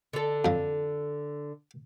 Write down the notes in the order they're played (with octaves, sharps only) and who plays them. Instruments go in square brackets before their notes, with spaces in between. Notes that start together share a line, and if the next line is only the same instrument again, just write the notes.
[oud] D3 A4
[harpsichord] F2 F3